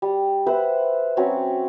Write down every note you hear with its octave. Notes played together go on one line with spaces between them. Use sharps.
G3
B4 C5 E5 F#5
F#3 C4 C#4